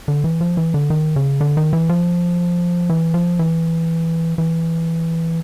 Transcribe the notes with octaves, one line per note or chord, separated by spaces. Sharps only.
D3
E3
F3
E3
D3
D#3
C#3
D3
D#3
E3
F3
E3
F3
E3
E3